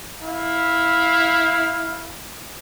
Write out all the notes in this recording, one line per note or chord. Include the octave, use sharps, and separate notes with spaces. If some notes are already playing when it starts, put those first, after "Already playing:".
E4 F5